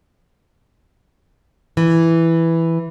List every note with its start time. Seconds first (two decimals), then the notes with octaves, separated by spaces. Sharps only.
1.77 E3